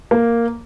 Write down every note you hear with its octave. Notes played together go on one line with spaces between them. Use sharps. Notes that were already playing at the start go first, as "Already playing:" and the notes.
A#3